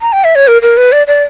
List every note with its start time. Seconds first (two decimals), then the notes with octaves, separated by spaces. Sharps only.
0.01 A#5
0.13 G5
0.24 E5
0.35 C#5
0.48 A#4
0.62 A#4
0.77 B4
0.92 D5
1.07 D5